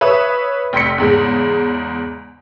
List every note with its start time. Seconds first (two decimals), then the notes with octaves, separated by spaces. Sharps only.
0.01 B4 C#5 E5 C#6 D#6
0.73 F1 G5 C6 B6 C#7
0.98 E2 G#2 C#3